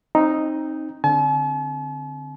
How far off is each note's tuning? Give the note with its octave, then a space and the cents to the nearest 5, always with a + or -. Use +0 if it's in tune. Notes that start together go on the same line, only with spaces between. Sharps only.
C4 +25 D#4 +0
D3 +0 C4 +0 A5 -45